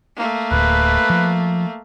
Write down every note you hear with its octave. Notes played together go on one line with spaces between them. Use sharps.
A3 A#3
D1 B4
F3